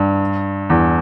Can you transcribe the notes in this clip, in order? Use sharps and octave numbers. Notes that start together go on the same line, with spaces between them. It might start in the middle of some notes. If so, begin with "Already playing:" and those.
Already playing: G2
E2